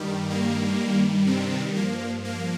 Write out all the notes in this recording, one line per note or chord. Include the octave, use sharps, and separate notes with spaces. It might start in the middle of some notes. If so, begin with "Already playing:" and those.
Already playing: G2 D#3 G3
A#3
C3 C4
G2 F3 A#3
A#3